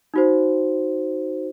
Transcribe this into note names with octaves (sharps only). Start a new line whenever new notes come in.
D#4 F#4 C5